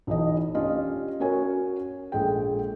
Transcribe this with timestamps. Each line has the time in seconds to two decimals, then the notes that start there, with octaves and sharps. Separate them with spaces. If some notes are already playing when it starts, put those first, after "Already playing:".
0.07 B1 E3 D#5
0.55 C#4 D4 F4 G4 D#5
1.20 C#4 F#4 A#4 C#5 G#5
2.12 A#1 G#3 A4 G5